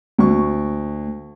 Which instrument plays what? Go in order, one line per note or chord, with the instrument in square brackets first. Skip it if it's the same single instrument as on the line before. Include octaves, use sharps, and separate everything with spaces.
[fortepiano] D2 C#6